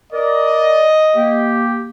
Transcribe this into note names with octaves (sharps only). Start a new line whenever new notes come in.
A#4 D5 D#5
A#3 G4